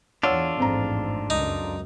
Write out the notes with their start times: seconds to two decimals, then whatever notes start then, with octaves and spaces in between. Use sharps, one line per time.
0.23 E2 D4 F4 C#5 F#5 E6
0.58 A1 F2 G#2 C4 A#5
1.30 C#2 F#2 D#4